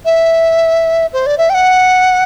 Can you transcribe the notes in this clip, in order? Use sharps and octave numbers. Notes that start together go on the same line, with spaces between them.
E5
C5
D5
E5
G5
F#5